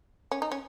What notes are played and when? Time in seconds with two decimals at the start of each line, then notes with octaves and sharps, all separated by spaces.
0.31 C#4
0.42 D#4
0.52 C#4